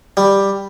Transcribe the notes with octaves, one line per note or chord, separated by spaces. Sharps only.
G3